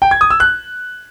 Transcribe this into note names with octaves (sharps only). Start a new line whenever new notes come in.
G5
G#6
D#6
E6
F#6